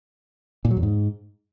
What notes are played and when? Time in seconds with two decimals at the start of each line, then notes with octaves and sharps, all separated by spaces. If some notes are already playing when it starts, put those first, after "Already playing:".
0.65 A#2
0.71 F#3
0.77 E2
0.83 G#2